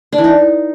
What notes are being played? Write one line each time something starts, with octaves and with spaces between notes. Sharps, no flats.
D4
E3
D#4